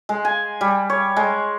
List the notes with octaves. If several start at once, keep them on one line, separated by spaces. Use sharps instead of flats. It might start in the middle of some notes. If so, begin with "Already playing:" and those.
G#3
G#5
G3
C#5
G#3